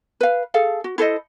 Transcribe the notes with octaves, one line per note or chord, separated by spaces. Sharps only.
B4 F5
G#4 A4 F5
F#4
E4 A4 C5 D#5